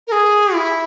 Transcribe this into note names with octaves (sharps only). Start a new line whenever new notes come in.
A#4
G#4
E4